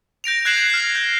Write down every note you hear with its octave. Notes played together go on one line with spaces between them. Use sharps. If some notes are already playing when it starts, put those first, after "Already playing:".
G6 A#6 D7 F7
F#6 G#6 C7 E7 F#7
F6 C7
G6